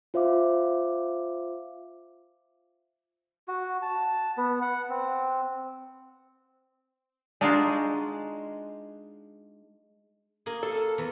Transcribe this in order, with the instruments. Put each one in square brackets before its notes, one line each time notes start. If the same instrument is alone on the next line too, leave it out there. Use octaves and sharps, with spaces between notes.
[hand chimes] F4 C5 E5 F5 D6
[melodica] F#4
A5
B3
F#5
C4
[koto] G#3 D4 D#4 F4 F#4 G#4
[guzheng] A#3 G#4
[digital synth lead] A4 [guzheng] C6
[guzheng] E2